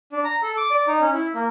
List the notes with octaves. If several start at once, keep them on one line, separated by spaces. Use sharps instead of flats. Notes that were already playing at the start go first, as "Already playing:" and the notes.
D4
A#5
A4
D6
D5
D#4
C#4
E4
A#3